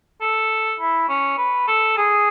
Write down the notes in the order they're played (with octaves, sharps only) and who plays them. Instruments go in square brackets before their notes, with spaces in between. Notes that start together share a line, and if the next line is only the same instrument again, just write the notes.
[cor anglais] A4
E4
C#4
B4
A4
G#4